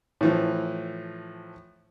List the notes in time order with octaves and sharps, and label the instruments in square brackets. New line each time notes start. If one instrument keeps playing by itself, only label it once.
[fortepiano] A2 E3 F3